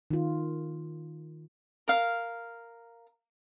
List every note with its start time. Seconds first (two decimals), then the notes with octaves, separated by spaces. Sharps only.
0.11 D#3 F4
1.88 A#4 F5